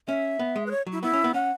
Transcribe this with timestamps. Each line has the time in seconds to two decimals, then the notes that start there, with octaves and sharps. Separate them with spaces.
0.08 C#4 E5
0.39 B3
0.56 G#3
0.66 B4
0.71 C#5
0.87 F#3
0.92 E4
1.03 B3 E4
1.13 C#4
1.24 B3
1.34 C#4 F#5